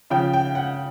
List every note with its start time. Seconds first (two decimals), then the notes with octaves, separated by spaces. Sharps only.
0.10 C#3 F3 G5
0.33 G5
0.55 F#5